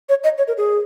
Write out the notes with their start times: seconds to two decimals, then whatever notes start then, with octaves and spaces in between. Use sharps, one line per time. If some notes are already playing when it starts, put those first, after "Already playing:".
0.09 C#5
0.24 D#5
0.38 C#5
0.48 A#4
0.57 G#4